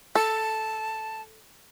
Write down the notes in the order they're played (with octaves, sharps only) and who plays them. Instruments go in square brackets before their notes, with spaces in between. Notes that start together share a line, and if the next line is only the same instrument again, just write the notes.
[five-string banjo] A4 [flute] A5